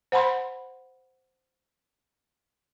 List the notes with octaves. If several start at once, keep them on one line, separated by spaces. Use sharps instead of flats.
C5 F#5 A5 B5 C6